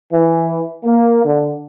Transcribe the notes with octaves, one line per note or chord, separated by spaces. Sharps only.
E3
A#3
D3